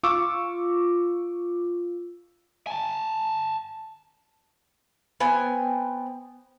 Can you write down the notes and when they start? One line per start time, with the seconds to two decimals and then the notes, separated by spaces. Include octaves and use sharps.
0.03 F4 C#6 D6 E6
2.67 G#5 A5
5.20 B3 C4 G5 G#5